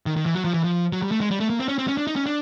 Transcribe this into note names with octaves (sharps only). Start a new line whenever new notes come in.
D#3
D#3
E3
F#3
F3
E3
F3
F#3
G3
A3
G#3
G3
A3
A#3
C4
C#4
C4
C#4
D4
D#4
C#4
D4